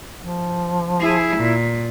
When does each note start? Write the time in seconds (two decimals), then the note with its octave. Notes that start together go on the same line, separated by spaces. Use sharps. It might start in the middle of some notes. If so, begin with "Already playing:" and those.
0.22 F3
1.01 E4 G#4
1.37 A#2